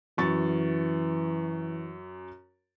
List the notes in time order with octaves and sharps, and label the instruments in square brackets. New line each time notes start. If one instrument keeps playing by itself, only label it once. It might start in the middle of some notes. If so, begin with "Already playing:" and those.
[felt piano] F#2 C#6 A6 [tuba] E3